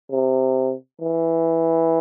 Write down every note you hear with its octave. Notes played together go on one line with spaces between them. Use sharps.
C3
E3